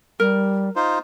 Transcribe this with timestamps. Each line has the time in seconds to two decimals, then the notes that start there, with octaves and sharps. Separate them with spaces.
0.20 G3 A#4
0.76 D#4 F4 C5